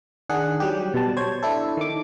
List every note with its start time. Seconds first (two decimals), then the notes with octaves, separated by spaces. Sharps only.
0.29 D#3 D4 G#4 F#5
0.60 F#3 G3 G4
0.94 B2 G3 A5
1.17 C5 C#5 G#6
1.43 D4 E4 A4
1.77 D#3 D6